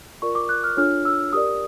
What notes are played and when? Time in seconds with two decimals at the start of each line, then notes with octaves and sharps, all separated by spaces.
0.22 F4 A#4 D5 C#6
0.35 D6
0.49 F#6
0.64 F6
0.77 D4 F4 A4 C#5 F6
1.05 E6
1.33 G4 A#4 D5 D#6